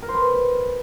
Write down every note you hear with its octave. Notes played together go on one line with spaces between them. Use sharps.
A#4
C5
B4